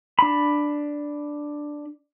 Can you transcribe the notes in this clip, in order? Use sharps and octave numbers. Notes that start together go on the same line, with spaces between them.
D4 B5